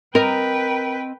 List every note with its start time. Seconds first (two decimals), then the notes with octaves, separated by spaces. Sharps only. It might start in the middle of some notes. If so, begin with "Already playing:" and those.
0.15 C4 A#4 B4 D#5 G5